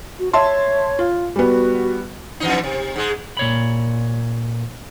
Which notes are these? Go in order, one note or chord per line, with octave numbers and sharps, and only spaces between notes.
F#4
C#5 E5 A5 C6
F4
G3 B3 F#4
F2 E3 D#4
C3
G#2 G#3
A#2 C#5 B5